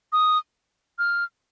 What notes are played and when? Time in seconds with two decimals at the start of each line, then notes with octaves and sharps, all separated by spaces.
0.13 D#6
0.99 F6